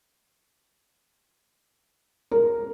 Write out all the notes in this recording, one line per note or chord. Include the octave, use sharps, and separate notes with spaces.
A#4